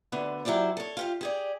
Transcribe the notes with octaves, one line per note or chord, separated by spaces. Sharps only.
D2 D3 B3
F#3 E4 G4 C5 D5
A4 C#5
F4 G4 F5
G4 G#4 D5